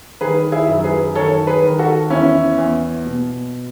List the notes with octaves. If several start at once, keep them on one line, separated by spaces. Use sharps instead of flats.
D#3 G#4 B4
E4 G#4
F#2
G#4 B4
D#3 A4 C#5
G#4 B4
D#3
F#4 A4
E2 C#4 E4
E2
B2